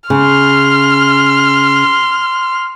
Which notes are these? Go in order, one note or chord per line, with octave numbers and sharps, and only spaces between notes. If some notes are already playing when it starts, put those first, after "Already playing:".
C#3 C6 F6